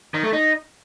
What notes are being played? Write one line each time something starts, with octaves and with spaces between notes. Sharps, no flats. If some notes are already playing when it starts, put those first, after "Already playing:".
D#3
A3
D#4